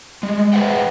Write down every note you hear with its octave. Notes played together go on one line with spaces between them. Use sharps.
G3 G#3
G#4 B4 C5 E5 F#5 G5